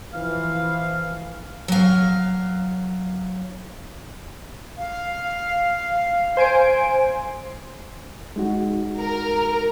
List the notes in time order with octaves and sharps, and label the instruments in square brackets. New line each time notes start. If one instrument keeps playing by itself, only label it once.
[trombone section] E3 F3 [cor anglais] F5
[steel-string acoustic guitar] F#3 F5
[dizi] F5
[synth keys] C5 G#5 D7
[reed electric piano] G#3 D#4 F#4
[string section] A#4